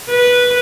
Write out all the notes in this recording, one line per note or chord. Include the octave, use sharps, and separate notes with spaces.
B4